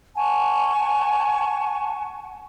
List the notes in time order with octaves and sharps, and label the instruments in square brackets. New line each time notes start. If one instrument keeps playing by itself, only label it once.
[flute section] F#5 G#5 A5 C#6